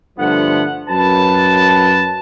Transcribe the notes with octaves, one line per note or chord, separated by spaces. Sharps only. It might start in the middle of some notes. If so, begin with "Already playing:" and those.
G2 D3 F3 A3 B3 F#5
F#2 B4 A5